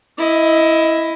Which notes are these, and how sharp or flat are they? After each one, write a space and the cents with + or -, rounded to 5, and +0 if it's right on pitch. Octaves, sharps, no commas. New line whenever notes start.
E4 +0 D#5 +20